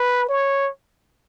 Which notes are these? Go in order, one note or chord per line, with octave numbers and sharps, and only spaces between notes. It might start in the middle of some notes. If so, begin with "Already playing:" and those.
Already playing: B4
C#5